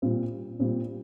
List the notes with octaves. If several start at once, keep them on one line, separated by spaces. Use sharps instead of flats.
A#2 G3 C4 F4
A#2 G3 C4 F4